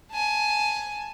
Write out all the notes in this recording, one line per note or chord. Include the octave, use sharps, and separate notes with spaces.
G#5 A5